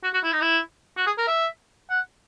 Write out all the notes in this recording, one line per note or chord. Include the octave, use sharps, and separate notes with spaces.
F#4
F#4
E4
D#4
E4
F#4
G#4
A#4
E5
F#5